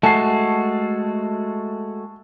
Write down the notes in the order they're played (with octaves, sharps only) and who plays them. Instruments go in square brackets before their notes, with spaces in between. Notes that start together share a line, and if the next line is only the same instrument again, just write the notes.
[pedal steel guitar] G#3 A3 F#4 [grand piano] A5 C7